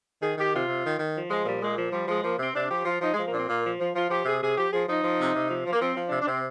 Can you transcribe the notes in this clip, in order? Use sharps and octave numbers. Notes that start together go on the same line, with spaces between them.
D#3 G#4
D#3 G4
C3 F4
C3
D#3
D#3
F3
F3 G#3
A#2 G3
A#2 G#3
F3
F3 G3
F3 G#3
F3 A#3
C3 C4
C3 D4
F3 G4
F3 F4
F3 D#4
G#3
F3
A#3
A#2 C4 D4
A#2 A#3
F3
F3
F3 F4
F3 G4
C3 G#4
C3 G#4
F3 G4
F3 G#4
F3 D#4
F3
C3
C3
F3
F3
A#3
F3 C4
F3
D4
C3
D4
C3 C4